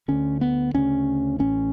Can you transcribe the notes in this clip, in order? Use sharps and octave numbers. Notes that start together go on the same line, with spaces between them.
D2 D3 C#4
B3
D2 C#3 C#4
A1 A2 C#4